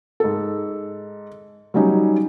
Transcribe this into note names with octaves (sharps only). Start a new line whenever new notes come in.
G#2 A4
F#3 G3 C#4 D#4